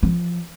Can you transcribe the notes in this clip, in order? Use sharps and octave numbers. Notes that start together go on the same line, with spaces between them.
F3